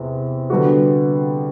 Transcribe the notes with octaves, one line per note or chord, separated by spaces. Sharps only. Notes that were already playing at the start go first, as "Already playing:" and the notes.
Already playing: E2 C3 C4
D3 G3 B3 F#4